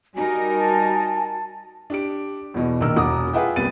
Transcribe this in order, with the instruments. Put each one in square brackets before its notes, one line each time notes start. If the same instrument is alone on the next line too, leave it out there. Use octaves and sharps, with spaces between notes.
[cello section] G3 D#4 A#4 [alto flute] F#4 [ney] G#5
[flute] A5
[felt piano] D4 G4 D7
E2 B2
A#1 D#3 A#4 E6
E1 F#5 A#5 D6 D#6
F4 G#4 B4 E5 F#5 G5
F#1 C2 G3 B3 A6 D#7